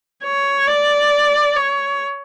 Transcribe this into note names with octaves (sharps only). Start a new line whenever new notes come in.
C#5
D5
C#5